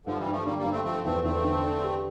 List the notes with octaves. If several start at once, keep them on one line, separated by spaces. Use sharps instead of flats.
G2 D3 F3
E3 G3
G2
F3 A3
D3 G3 A#3
G3 A#3
G2
A3 C4
F3 A3 C4
E2 A3 C4
E2 A3 C4
D3
D4
G4